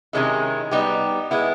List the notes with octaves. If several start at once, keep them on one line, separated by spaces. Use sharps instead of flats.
C3 D#3 G#3 C#4 E4
G3 B3 D#4 G4
G#3 B3 E4